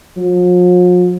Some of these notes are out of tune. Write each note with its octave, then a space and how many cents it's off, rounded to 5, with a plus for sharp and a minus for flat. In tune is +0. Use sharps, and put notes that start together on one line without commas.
F3 +45